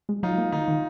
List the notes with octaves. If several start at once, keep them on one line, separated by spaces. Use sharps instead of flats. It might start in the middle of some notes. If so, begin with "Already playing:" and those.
G#3
F#3 D#4 F4
A#3
D#3 D#4 F4
D#3